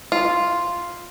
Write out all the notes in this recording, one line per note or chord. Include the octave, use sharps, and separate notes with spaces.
F4